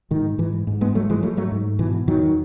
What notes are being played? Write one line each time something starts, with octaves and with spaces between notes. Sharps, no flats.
G#2 D#3
G#2 E3
G#2
G#3 B3
G#2 F#3 A3
E3 G#3
G#2 F#3 A3
F#3 A3
G#2
B2 E3
E2 D#3 F#3